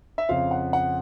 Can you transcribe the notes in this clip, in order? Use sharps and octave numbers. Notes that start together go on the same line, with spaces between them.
E5
F2 C#3 F3 F5
F#5
F#5